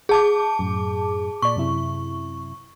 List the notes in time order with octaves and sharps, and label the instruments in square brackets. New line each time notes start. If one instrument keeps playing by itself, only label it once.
[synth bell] G#4 A5 D6
[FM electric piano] F#2 A2
[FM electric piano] A#2 D5 [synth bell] C#6
[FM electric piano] F#2 C3 E4